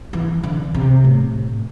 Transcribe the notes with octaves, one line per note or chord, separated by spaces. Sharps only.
E3
D3
C3
A2